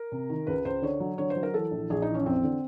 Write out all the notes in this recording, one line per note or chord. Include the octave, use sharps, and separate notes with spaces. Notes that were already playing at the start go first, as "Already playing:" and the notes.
Already playing: A#4
C3
D#3
C#2 B4
C#2 C5
D3 C#5
F#3
D3 C#5
C5
F#3
A#4
E3 A4
A#1
A#1 G#4
D#4
E3
C#4
F2 C4
D3